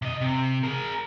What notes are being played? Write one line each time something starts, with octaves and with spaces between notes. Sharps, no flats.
C3 D#5
C3
G#4 A#4